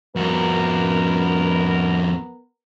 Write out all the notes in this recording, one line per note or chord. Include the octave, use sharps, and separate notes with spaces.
F2 B3 F#4 A#4